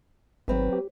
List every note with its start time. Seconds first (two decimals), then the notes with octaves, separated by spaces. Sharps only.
0.48 G#1 F#3 C4 B4
0.72 G4